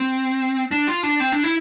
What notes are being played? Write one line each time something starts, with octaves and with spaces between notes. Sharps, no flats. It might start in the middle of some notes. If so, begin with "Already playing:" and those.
Already playing: C4
D4
F4
D4
C4
D4
E4